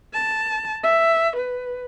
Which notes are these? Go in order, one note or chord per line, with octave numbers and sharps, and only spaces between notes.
A5
E5
B4